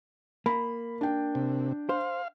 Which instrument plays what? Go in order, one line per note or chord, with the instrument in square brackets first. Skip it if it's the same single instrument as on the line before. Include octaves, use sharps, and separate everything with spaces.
[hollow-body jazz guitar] A#3 [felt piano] B5
[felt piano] D4 G5
[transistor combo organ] C3
[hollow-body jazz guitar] C5 [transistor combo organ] F5